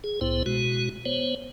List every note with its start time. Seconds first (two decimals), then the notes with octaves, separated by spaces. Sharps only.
0.04 G#4
0.21 C2 A2 B3 E4 C5
0.46 B2 G#3 F#4
1.05 B3 C5 C#5